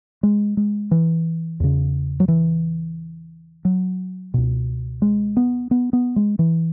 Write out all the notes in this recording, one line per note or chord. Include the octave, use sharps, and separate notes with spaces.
G#3
G#3
E3
E2 C#3
F#3
E3
F#3
C#2 B2
G#3
B3
B3
B3
G#3
E3